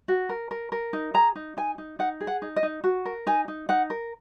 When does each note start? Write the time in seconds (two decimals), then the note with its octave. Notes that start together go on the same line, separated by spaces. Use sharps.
0.08 F#4
0.29 A#4
0.51 A#4
0.72 A#4
0.93 D#4
1.14 G#4 A#5
1.35 D#4
1.57 D#4 G#5
1.78 D#4
1.99 D#4 F#5
2.20 G#4
2.27 F#5
2.42 D#4
2.56 D#5
2.63 D#4
2.84 F#4
3.05 A#4
3.27 D#4 G#5
3.48 D#4
3.69 D#4 F#5
3.90 A#4